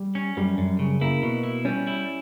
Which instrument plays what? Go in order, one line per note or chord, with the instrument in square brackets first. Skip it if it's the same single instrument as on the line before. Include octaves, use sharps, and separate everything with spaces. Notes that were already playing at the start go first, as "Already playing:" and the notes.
Already playing: [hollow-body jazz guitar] G3
[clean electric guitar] C#4
[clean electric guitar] F#2 [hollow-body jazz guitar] G3
[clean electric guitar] F#2
C#3
[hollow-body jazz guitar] A#3 [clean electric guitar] E4
[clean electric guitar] B2
E4
[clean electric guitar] G3 [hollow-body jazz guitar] C#4
[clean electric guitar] E4